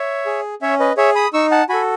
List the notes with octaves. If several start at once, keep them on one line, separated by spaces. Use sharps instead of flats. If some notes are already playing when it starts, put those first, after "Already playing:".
Already playing: C#5 E5
G#4
C#4 C#5 E5
B4 D#5
G#4 C#5 E5
B5 D#6
D#4 C#6 E6
F#5 A5
F#4 A4 G#5 B5